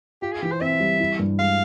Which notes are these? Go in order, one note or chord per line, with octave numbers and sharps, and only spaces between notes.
F4 G4
G#4
E3 G4
C5
C4 E5
G3
E4
G2
G#3 F5